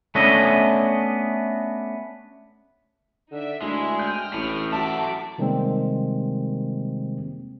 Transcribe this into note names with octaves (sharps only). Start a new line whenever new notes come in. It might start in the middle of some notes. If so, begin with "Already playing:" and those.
A3 B3 C#4 D4 D#5
D3 D#4 D5 E5
D2 G#3 D4 E4 G#4
G5 D#6 F6 G6
A1 A2
F#3 F#4 A4 E5 A5 D6
C3 D#3 G3 G#3 A#3 C4